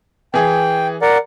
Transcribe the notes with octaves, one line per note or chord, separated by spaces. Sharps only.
E3 G#4 G5
A#4 D5 F#5